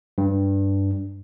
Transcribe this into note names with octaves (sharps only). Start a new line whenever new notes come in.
G2